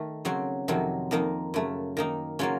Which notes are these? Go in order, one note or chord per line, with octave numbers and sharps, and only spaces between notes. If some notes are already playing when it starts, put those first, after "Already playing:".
Already playing: D#3 A3
C#3 F#3 C4 F#4
F2 C3 D#3 F#3
F2 D#3 A#3 D#4
F#2 C#3 A3
D#3 A#3 D#4
C#3 F#3 A#3 C#4 F4